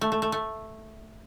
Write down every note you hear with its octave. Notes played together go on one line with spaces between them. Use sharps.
A3
A3
A3
A3